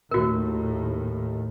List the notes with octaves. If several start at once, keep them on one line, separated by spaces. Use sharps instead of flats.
D#2 A2 F#4 A#4